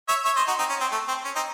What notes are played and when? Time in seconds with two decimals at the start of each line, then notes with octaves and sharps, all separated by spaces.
0.08 C#5 E5
0.25 C#5 E5
0.36 C5 D#5
0.48 D#4 F#4
0.59 C4 D#4
0.69 C#4
0.80 C4
0.92 A3
1.08 C4
1.25 C#4
1.35 C4 D#4